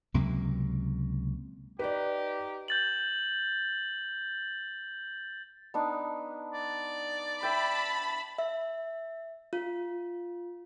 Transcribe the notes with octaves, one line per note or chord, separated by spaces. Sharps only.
C#2 C3 F#3 A#3
D#4 G4 B4 D5
G6 A6 F#7
B3 D4 D#4
D5
E5 G5 A5 B5
E5
F4